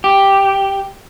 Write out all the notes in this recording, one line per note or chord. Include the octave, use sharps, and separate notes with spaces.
G4